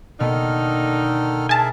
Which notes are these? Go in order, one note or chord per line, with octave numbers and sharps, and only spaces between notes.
B2 D3 D#3 A#3 B3 D#4 A4 F6
G#4 A#4 E5 G#5 A5